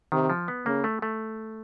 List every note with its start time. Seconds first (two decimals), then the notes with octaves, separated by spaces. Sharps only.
0.12 C3 D#3
0.30 F3
0.48 B3
0.66 C#3 A#3
0.84 A3
1.02 A3